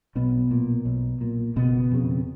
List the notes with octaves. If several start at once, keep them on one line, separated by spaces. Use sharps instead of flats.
B1 B2 B3
A#2
B1
A#2
F#1 B2 B3
F2 C#3